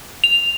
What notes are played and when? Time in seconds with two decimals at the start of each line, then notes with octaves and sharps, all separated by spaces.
0.24 F7